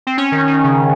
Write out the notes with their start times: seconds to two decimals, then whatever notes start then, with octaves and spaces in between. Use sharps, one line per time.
0.07 C4
0.18 C#4
0.32 D#3
0.47 D#3
0.64 C#3